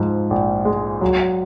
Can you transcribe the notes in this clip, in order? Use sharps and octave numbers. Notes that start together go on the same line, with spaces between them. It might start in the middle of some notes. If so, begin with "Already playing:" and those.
Already playing: G#2 F3
A#1
G#3
F#3